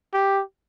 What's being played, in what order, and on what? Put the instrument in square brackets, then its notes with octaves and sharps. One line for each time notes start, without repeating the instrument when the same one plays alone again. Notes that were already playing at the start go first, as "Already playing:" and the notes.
[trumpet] G4